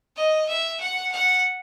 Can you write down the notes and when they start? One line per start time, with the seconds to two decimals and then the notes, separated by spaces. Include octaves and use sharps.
0.16 D#5
0.48 E5
0.80 F#5
1.12 F#5